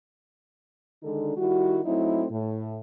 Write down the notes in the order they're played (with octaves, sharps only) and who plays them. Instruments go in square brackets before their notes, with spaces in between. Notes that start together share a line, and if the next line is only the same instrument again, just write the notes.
[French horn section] D3 D#3 G#3 D4 D#4 A4
D#3 G3 E4 F#4
F#3 A3 C4 D#4 E4
A2